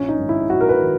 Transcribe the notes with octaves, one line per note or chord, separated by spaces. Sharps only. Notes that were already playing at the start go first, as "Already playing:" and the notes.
Already playing: A#1 C#4
D#4
G#2 D#3
E4
A#1 F#4
A#4
B4
D#3